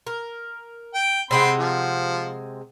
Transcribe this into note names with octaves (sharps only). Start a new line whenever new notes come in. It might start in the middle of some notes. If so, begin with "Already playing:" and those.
A#4
G5
C3 G#3 C4 F#5 B5 C6
F3